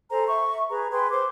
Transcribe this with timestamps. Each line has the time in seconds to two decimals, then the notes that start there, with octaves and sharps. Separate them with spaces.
0.11 A4 C5 G#5 A#5
0.28 E5 C#6
0.70 G#4 B4 A#5
0.91 G#4 B4 G5 C6
1.11 C5 C6 D6